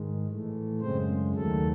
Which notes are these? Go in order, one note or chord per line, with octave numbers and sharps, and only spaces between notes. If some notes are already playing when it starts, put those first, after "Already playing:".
Already playing: G#2 D#3 G#3
A2 E3 A3
F#2 C#3 G#3 C4 C5
D#2 D#3 F#3 A3 A4